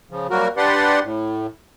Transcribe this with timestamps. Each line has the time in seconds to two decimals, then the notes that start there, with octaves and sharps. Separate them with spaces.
0.11 C#3 F3
0.30 F#3 G3 A#3 F#4 A#4
0.57 D4 G4 B4 D5 F#5 C6
1.04 A2